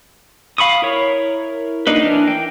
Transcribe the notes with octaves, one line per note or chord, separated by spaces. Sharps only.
F5 B5 C#6 D#6
E4 A#4 C#5
A#3 D4 D#4 B4
E3 D4 A#4
G5